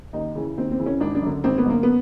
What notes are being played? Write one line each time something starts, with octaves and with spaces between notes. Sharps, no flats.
D#2 D#4
C#3 E3
D#2 C4
C4
C#3 E3
C#4
G#1 D4
D4
F#2 D3
G#1 C4
B3
F#2 D3 A#3
B3